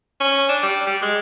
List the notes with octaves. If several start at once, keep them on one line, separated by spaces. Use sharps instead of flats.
C#4
D4
G3
G3
G#3